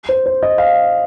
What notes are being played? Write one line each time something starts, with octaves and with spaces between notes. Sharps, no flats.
C5
C5
D#5
F5